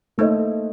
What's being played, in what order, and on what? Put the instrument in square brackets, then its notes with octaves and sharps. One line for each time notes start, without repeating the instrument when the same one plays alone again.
[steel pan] A3 [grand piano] A#3 D#4 A4 C5 D#5